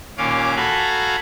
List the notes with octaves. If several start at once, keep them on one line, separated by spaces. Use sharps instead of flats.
D#2 A#2 C#4 F5 D6
F#4 A4 F5 G#5 A#5 B5